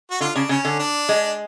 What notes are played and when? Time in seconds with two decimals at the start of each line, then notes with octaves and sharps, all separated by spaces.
0.11 F#4
0.20 D3 F4
0.35 C#3 D4
0.49 C#3 C#4
0.65 D3
0.79 D4
1.09 G#3